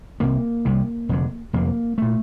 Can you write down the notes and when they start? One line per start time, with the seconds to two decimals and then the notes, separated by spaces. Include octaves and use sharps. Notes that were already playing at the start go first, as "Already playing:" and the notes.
0.20 C2 C3 A#3
0.65 C2 C3
1.09 F1 F2 D3
1.53 F1 F2 D3 A#3
1.98 A#2 A3